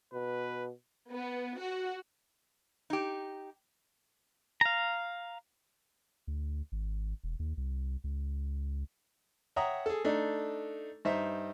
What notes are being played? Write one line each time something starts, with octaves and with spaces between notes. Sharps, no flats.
B2 B4
B3
F#4
D#4 G4
F5 A#5
D2
G#1
E1
D#2
C2
C#2
C#5 E5 F#5 G5 A#5 D#6
G#4 A4
A3 D4 D#4 A4
G2 D#4 C5 E5